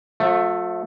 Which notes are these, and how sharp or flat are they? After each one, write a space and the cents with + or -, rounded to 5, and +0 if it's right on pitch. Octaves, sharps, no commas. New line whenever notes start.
F3 +45 A3 +0